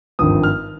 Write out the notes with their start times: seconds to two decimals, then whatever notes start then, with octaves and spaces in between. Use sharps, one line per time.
0.19 G#1 G2 F3 D#6
0.43 F6